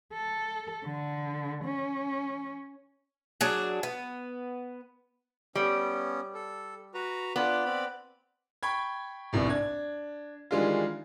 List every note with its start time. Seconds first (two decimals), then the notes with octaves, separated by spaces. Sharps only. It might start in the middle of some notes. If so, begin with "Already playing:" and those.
0.13 A4
0.84 D3
1.65 C#4
3.41 F#3 D4 G#4
3.83 B3
5.55 G3 B3 C#4
6.35 A4
6.94 F#4 B4 A#5
7.36 B3 D4 F4 D5
7.65 C4 D5 B5
8.63 G5 B5 C#6 G#6
9.33 G1 C2 A2 C3
9.47 D4 G#6
10.51 D#3 E3 G3 G#3 D4 F4